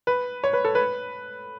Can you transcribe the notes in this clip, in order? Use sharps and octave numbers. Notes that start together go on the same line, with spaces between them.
B4
C#5
B4
A4
B4